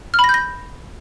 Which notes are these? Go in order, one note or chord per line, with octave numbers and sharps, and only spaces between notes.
F6
B5
A#6
G6
A#6